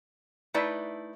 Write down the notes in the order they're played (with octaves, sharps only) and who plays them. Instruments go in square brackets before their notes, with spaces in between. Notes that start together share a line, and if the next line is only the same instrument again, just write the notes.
[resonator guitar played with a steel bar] A3 D#4 E4 B4 D5